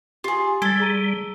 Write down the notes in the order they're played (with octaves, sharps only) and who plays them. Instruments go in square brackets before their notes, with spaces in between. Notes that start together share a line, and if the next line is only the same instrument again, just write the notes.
[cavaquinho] F4 G#4 [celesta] G4
[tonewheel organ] G3 [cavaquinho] A4 [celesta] G#6 A6
[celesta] G#4 A#5 D#7